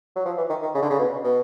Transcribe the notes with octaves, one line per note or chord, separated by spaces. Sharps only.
F#3
F3
E3
D#3
D#3
C#3
D3
C#3
B2
B2